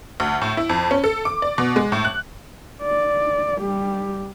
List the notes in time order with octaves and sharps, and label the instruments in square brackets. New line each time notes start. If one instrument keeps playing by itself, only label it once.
[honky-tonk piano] D2
A2
E4
F2
C#4
A4
D6
D5
B2
G#3
A2
F#6
[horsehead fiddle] D5
G3 G4